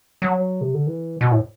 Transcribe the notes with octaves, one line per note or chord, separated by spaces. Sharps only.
F#3
C3
D3
E3
B2
A2